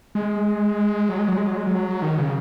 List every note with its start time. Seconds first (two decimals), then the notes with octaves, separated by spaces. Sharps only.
0.15 G#3
1.09 F#3
1.19 G#3
1.28 F#3
1.38 G#3
1.47 F#3
1.57 G#3
1.67 F#3
2.02 D#3
2.18 C#3